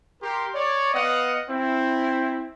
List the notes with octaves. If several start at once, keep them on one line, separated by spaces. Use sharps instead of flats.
G4 A#4 C6
C#5 D5
B3 D#5 F5 F#5
C4 E4